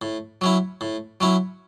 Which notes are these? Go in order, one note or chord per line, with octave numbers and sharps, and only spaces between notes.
A2
F#3 C#4 E4
A2
F#3 C#4 E4